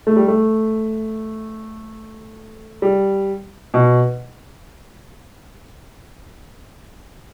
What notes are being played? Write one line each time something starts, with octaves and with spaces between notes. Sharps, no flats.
A3
G3
A3
G3
B2